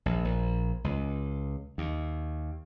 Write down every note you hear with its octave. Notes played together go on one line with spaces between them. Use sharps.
A#1
A#1
C#2
D#2